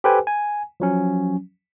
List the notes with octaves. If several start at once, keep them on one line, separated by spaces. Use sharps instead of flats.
G4 A4 B4 C5 G5 G#5
G#5
F3 F#3 C#4